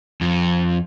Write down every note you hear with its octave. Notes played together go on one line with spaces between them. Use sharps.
F2